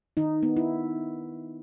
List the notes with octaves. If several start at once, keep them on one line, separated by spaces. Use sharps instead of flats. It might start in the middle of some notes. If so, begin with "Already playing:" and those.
D#3 D#4
B3
E4